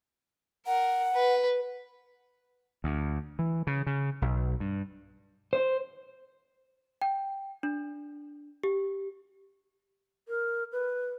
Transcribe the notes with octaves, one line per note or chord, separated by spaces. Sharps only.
A#4 F#5
B4
D2
E3
C#3
C#3
B1
G2
C5
G5
D4
G4
A#4
B4